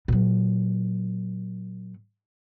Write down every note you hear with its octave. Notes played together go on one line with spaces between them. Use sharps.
A#2 F#3